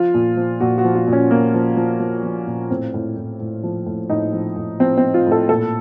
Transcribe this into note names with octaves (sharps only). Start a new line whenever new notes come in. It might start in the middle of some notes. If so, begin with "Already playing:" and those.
Already playing: F3 F4
A#2
F3
A#2 F#4
F#4
F3
F4
A#2
C#4
A#2 A#3
F3
F3
F3
F3
A#2
A2 C4
A2
A2
A2
F3
A2
A2 D#4
F3
A2
F3 C4
C4
F3
F4
A2
A4
A#2 A4